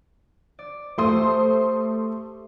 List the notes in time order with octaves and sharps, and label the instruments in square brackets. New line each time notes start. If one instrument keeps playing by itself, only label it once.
[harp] D5
[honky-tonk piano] A3 C6 D#6 [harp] G4 A4 C5